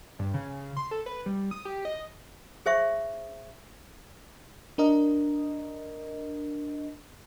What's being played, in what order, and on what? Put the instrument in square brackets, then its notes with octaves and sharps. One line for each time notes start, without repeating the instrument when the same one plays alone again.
[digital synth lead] G2
C#3
C6
A4
B4
G3
D#6
G4
D#5
[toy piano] G#4 C5 E5 C#6
[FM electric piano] D4 A#4 D#5